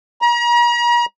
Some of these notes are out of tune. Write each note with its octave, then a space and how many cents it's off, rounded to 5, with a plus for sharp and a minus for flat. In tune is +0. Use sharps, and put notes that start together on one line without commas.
A#5 +40